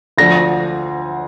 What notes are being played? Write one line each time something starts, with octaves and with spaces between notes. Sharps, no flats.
D2 D3 F3 A#6